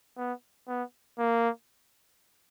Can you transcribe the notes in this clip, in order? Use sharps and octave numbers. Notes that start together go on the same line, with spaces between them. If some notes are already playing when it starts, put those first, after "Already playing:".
B3
B3
A#3